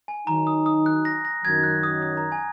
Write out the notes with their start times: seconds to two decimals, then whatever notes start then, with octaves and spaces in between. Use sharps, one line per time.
0.08 G#5
0.27 D#3 F#3 D#4 A#5
0.47 D#6
0.66 D#6
0.86 F#6
1.05 A#6
1.25 A#6
1.43 F#2 D#3 F#3 G#6
1.63 F#6
1.83 D#6
2.02 D#6
2.17 A#5
2.32 G#5